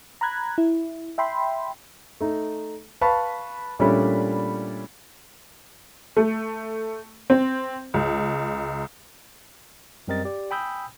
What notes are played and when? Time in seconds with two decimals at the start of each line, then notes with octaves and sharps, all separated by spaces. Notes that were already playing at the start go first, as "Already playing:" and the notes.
0.21 A#5 B5 F#6 G#6
0.58 E4
1.18 E5 G5 B5 C6
2.21 A3 D#4
3.01 B4 F5 A5 B5 C#6
3.79 A#2 G3 A3 C#4 D4 B5
6.17 A3
7.30 C4
7.94 C#2
10.08 F#2 G3 C4 A#4 D#5 A6
10.25 G4 D5
10.51 G5 G#5 B5 D#6 E6 G6